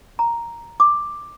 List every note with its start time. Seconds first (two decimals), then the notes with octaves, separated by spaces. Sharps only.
0.19 A#5
0.80 D6